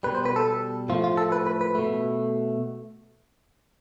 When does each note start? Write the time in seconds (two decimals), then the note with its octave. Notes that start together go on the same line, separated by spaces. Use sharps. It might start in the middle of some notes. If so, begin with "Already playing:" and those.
0.03 B2 G3 B4
0.15 C5
0.25 B4
0.36 A4
0.89 A2 F3 A3 F4
1.04 F4
1.17 A4
1.32 B4
1.47 B4
1.61 B4
1.75 B2 A3